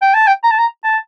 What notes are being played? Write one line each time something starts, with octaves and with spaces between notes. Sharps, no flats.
G5
A5
G5
A#5
A5
A#5
A5